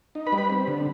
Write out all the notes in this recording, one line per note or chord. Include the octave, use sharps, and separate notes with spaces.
D#4
B4 B5
G3
B4 B5
C4
D3